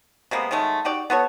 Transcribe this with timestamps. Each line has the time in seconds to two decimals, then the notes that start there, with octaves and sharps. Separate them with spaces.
0.31 C3 G#3 A#3 B3
0.51 D#3 F#3 G#3 A3
0.85 D#4 F#4 G4 D5
1.10 B3 F#4 A4 C#5